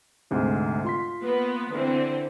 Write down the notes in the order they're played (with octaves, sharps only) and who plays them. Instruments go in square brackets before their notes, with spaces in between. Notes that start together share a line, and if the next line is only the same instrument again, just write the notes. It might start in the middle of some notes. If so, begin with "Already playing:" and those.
[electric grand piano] D2 G#2 C3
F4 C6 B6
[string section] A#3 B3 B4
D3 E3 C4